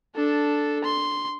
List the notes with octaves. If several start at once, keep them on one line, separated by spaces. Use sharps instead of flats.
D4 A4
C6